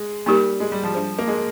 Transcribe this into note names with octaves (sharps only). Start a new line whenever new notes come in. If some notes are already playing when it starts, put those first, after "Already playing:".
Already playing: G#3
G3 A#3 D#4 G4 A#4
G#3
G3
F3
G3 D4 G#4 C5
A#3
G#3